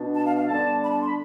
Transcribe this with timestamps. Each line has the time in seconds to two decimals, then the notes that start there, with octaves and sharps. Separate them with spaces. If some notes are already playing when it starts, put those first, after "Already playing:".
Already playing: B2 B3 D4
0.14 A5
0.25 F5
0.37 F5
0.48 D3 G3 B3 D4 A5
0.82 B5
0.90 A5
0.99 C6
1.08 B5